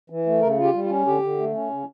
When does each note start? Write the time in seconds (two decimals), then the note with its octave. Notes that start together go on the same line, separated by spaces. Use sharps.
0.10 E3
0.26 A3
0.42 C#3 A#4
0.58 F4
0.64 G4
0.74 G3
0.84 F4
0.90 C#4
1.06 D3 G4
1.22 D3
1.38 A3
1.55 C#4
1.71 C#3